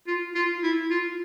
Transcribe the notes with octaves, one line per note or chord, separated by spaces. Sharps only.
F4
F4
E4
F4